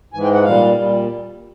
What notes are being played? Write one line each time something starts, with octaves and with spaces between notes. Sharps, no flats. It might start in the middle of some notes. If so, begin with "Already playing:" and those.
G#2 E3 G#3 G#5
G5
F#5
A#2 G3 F5
A#2 G3